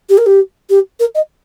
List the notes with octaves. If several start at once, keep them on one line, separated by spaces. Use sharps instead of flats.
G4
A#4
G4
G4
A#4
D#5